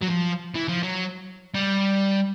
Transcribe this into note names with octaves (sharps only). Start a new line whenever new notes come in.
F#3
F3
E3
F3
F#3
G3